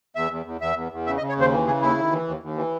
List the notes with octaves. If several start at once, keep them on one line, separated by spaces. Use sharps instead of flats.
E2 E5
E2
E2
E2 E5
E2
E2
C#3 E5
D#5
C#3
C#5
D#2 C5
E3
C#3 G#4
D#2 E4
D#2
E3
D#2
D#2
E3